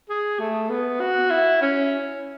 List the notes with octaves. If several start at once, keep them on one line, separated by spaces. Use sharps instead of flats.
G#4
A3
B3
F#4
E4
C#4